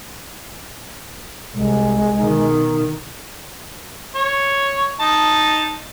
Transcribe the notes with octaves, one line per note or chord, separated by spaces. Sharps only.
C2 G#3
B2 D#3
C#5
D#4 A5